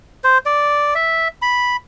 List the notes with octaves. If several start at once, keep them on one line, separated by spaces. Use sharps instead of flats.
C5
D5
E5
B5